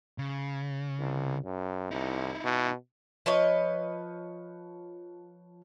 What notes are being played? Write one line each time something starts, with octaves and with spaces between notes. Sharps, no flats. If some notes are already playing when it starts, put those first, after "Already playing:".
C#3
C2
F#2
C2 D#4 E4
B2
F3 B4 C#5 D#5